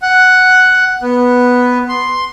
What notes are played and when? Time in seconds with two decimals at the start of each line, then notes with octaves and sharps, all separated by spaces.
0.02 F#5
1.02 B3
1.89 C6